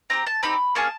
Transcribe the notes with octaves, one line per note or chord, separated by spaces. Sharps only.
C4 D#4 G4 A#5
A5
C4 D#4 G4 B5
A#3 C#4 G#4 A5